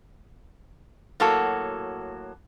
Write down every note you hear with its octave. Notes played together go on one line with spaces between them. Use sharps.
A2 F#3 A#3 F#4 A4